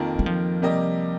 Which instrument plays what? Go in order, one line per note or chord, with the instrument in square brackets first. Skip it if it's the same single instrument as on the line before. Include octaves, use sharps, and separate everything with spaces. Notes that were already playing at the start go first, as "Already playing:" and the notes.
Already playing: [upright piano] F2 D#3 A#3 F4 A#4
[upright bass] G3
F3
[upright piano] C3 G3 A#3 G4 D#5